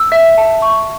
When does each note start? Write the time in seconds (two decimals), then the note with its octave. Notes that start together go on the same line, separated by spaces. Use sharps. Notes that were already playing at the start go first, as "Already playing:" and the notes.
Already playing: E6
0.12 E5
0.38 A5
0.62 C#6